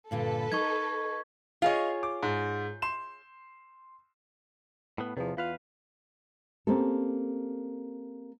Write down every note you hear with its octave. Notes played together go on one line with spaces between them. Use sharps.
G2 A#2 D3 A4 B4
D#4 A#4 D#5 C#6 G#6
F4 G#4 C#5 D#5 F5
D6
G#2
C6 E7
A2 B3
E2 C3 F3
E2 F4 B4 F5
A#3 C4 C#4 G4 A4